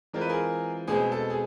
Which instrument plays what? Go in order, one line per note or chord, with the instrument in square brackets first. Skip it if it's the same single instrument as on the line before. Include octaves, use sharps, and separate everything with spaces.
[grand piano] E3 G#3 C4 F4 A#4
B4
G#4 A#4
B2 G#3 C4 G#4
A4
G#4